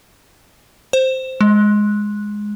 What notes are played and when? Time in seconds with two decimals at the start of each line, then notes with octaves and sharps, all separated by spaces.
0.93 C5
1.41 G#3